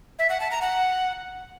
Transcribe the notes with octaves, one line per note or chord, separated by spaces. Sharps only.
E5
F#5
A5
A#5
F#5